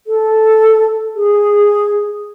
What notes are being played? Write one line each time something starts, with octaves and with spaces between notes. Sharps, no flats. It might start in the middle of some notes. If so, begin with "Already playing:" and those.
A4
G#4